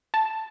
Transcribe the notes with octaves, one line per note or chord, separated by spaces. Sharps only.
A5